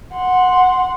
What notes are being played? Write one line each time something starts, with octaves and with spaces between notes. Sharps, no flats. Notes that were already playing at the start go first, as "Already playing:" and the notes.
F#5 C6